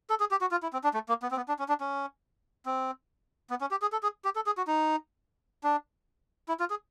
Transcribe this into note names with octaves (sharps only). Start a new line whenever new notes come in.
A4
G#4
G4
F#4
F4
E4
C4
D4
A3
A#3
B3
C4
B3
D4
C#4
D4
C#4
C4
B3
C#4
G4
G#4
A4
G#4
G4
A4
G#4
F#4
D#4
D4
E4
F4
G#4